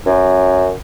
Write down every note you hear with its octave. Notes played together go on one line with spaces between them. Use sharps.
F#2